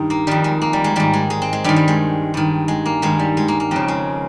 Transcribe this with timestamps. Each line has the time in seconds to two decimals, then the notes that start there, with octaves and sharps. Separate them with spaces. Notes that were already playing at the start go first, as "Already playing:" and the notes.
Already playing: G2 D#3 D#4
0.10 A#3
0.27 F2 D#3 G3
0.44 G#3
0.62 A#3
0.73 G3
0.84 G#3
0.96 G#2 D#3 G3
1.13 G#3
1.30 G#3
1.42 C4
1.53 G#3
1.64 G2 D#3 G3
1.76 G3
1.88 G#3
2.34 G2 D#3
2.68 G#3
2.86 A#3
3.02 G2 D#3 G#3
3.19 G3
3.37 G#3
3.48 A#3
3.60 A#3
3.71 F2 C#3 C4
3.88 G#3